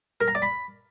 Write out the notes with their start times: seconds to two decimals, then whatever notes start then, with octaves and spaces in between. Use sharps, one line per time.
0.21 A#4
0.28 A#5
0.35 D5
0.42 B5